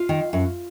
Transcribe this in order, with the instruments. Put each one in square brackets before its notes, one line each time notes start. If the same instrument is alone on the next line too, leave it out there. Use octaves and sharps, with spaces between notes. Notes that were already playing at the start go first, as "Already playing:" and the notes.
Already playing: [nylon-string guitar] F4 F5
D#3
F#2